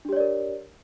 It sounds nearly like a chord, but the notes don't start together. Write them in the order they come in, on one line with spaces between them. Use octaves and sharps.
D4 G4 C#5 D5 A#4